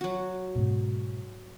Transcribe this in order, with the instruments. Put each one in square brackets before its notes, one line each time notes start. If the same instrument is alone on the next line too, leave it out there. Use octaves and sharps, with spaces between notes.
[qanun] F#3 F#4
[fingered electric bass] G#2 B2